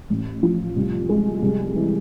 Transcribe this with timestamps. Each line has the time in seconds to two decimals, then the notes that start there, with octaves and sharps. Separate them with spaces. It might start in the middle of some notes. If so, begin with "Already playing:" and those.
0.10 A1
0.43 F3
0.76 C2
1.09 G#3
1.42 C2
1.75 E3